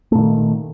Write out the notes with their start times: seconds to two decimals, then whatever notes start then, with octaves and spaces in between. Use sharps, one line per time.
0.12 A3
0.15 A#2
0.18 D#3